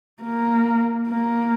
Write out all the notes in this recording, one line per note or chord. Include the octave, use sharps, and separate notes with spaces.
A#3
A#3